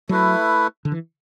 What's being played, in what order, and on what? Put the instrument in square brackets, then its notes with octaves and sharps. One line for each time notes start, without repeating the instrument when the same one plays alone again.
[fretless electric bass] F#3 [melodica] A3 E4 B4
[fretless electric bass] D3
E3